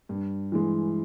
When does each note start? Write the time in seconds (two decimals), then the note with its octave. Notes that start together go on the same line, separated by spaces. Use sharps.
0.09 G2
0.52 E3 G#3